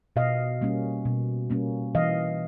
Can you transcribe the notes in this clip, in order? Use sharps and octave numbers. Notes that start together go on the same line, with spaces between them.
B2 D#5 F5
G3 A#3 C#4
B2
G3 A#3 C#4
E3 D#5 F5